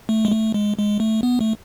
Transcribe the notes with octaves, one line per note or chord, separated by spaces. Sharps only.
A3
G#3
A3
G#3
G#3
A3
B3
A3